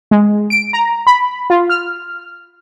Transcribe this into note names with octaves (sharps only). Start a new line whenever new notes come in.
G#3
D7
A#5
B5
F4
F6